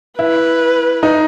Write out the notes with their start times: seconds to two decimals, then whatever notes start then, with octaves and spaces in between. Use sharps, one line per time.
0.19 E4 B4
1.03 D#4